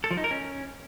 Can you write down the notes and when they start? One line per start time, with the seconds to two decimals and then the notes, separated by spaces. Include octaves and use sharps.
0.04 A4
0.11 F3
0.17 D#4
0.24 A#4
0.31 C#4